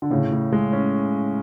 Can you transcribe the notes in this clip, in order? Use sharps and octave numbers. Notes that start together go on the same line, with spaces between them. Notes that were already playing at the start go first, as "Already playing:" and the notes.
D3
A2 C#3
A2
G#3
C#4